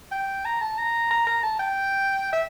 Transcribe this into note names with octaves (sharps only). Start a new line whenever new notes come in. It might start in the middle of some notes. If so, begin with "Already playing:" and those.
G5
A#5
A5
A#5
A#5
A#5
A5
G5
E5